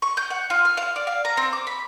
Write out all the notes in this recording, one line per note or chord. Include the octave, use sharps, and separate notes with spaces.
C#6
G6
F#5
F4
F6
F5
D5
F5
A#5
C4
D6
B5